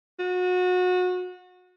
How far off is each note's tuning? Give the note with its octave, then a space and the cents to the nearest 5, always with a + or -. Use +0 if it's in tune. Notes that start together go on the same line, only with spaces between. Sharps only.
F#4 -30